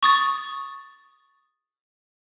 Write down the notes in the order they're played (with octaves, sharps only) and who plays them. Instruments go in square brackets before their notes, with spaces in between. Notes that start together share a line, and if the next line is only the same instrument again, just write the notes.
[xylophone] C#6 D#6 A6